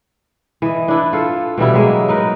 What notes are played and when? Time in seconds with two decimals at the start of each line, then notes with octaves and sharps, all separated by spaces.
0.62 E3 D#5
0.88 D4 E4 B4
1.13 F4 A4
1.58 B2 E3 G3 E4
1.74 F#3 G#3 A#3
2.08 D#4 A#4 B4